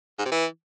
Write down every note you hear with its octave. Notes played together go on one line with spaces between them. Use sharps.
G#2
C3
E3